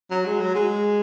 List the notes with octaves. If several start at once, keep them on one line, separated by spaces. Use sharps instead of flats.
F#3
G#3
F#3
G#3